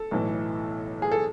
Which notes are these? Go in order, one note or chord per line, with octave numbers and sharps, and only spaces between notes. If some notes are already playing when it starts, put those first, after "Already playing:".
Already playing: A4
B1 A2 E3
G#4
A4